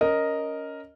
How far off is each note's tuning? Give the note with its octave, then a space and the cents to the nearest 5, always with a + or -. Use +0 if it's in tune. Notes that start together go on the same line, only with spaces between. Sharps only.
C#4 +15 A#4 +0 D#5 +0